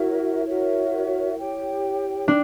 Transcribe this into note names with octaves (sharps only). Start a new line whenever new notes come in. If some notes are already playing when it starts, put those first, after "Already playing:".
Already playing: E4 F#4 A#4 C#5 E5
F#4 A#4 C#5 E5
G4 C#5 G5
D4 G5